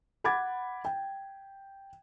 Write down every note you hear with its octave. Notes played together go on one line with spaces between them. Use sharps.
F#5 B5 D6 G#6 A6
G5